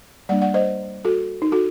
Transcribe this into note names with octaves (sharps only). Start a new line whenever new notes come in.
G3 A#3 D4 D5 F#5
D5 F#5
C5 D#5
F#4 A4
D#4
F#4 A4